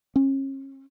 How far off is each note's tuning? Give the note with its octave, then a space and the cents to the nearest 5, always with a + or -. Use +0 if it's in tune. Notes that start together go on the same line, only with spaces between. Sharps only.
C#4 -35